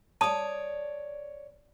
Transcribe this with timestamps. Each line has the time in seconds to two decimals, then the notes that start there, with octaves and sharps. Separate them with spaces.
0.21 C#5 D5 A5 D#6